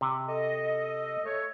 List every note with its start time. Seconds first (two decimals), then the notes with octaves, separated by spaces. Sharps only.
0.01 C3
0.28 A4 D#5
1.25 A3 A4 C#5